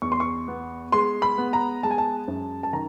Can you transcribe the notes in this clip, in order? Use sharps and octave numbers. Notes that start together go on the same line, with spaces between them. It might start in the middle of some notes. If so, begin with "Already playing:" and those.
E2 C#6
C6
C#6
B3
G#3 C6
B5
B3
A#5
G#3 A5
G#5
A5
F#2
A5
D#3 A#5